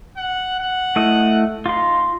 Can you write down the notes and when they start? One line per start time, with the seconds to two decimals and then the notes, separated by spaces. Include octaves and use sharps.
0.17 F#5
0.59 F#5
0.96 A3 E4 D#5
1.66 D#4 F4 C6